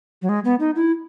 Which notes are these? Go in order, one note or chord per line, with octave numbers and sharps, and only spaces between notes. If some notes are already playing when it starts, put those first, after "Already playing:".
F#3
G#3
B3
D#4
E4